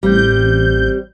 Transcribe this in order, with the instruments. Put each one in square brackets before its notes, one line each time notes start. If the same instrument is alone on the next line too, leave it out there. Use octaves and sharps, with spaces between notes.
[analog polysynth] A1 G6 [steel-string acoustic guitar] G3 C4